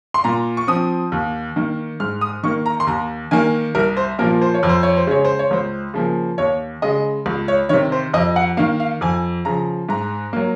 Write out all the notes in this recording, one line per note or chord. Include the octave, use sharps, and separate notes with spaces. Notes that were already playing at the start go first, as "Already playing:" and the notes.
C6
A#2 A#5
C#6
F3 C4 D#6
D#2
D#3 A#3
G#2 F6
D#6
D#3 A#3 C#6
A#5
C6
D#2 A#5
D#3 A#3 G#5
C2 A#4
C5
A#2 F3 A#3 A#4
C5
C#5
F2
C5
C#5
C5
C#3 G#3 C#5
C5
C#5
C#2 C5
C#3 F3 A#3
D#2 C#5
C#3 G#3 D#5
C#2
C#5
C3 D#3 C#5
C5
F2 D#5
F#5
D#3 A#3 F5
F5
F2 G#5
C#3 F3 A#5
G#2 A#5
F#3 A#3